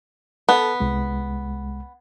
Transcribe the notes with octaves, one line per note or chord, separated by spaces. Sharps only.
B3 A4 A5
C2 G#3